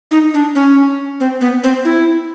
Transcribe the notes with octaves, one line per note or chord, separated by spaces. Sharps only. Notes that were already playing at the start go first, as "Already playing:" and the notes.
D#4
D4
C#4
C4
B3
C4
E4